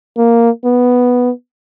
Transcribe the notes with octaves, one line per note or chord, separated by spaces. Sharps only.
A#3
B3